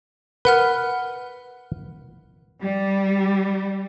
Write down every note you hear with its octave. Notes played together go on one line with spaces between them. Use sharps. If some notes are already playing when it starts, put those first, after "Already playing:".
A#4 B4 F#5 F6
G3